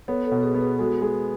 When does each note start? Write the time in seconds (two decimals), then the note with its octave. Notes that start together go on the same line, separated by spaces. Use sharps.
0.08 B3 A4 C#5
0.26 A4 C#5
0.31 B2
0.43 G#4 B4
0.55 B3
0.61 G#4 B4
0.79 G#3 F#4 A4
1.02 G#3